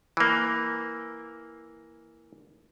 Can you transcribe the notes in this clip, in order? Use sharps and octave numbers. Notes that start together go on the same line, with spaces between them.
E3 A#3